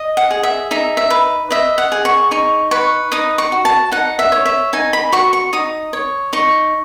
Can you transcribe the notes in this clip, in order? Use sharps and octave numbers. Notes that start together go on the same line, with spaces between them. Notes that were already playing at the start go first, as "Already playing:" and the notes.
Already playing: D#5
F#5
G#4
E5
D#4 E5
E5
B4
D#5 E5
F#5
G#4
C#6
D#4 C#6
B4 C#6
D#4 D#6
C#6
F#4
A5
D#4 F#5
E5
C#5
E5
D#4 G#5
B5
F#4 C#6
C#6
D#4 D#6
C#5
D#4 C#6